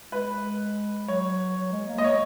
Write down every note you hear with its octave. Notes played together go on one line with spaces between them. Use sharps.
G#3 B4
F#3 C#5
F#3
G#3
A#3
D#5
G#3 C#5